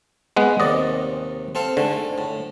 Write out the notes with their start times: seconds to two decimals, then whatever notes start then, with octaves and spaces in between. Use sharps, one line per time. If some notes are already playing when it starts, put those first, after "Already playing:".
0.37 G#3 B3 B4
0.60 D#2 C3 D5 D#5
1.55 C4 A4 F5
1.77 G#2 D3 A3
2.18 A2